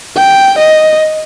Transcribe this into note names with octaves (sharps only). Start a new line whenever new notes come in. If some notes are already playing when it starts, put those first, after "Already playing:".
G5
D#5